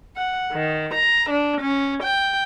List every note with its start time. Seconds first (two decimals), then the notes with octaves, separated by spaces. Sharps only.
0.16 F#5
0.53 D#3
0.95 A#5
1.30 D4
1.61 C#4
2.03 G5